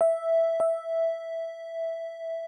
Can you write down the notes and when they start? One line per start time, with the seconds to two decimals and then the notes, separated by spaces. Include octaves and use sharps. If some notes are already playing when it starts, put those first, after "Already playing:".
0.01 E5
0.60 E5